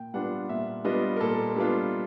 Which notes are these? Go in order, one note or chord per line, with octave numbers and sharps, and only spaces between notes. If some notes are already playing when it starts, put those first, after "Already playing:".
Already playing: A#2 G5
G3 B3 D4 F4 F#5
A#2 E5
G3 B3 D4 F4 D#5
A#4
A#2 A4
G3 B3 D4 F4